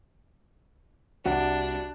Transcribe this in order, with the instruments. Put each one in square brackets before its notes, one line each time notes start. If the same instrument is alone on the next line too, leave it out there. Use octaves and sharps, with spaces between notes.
[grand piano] C2 F#5 F#6 [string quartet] D4 [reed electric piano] F#4